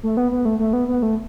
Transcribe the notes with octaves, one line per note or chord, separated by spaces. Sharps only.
A3
B3
B3
A3
A3
B3
B3
A3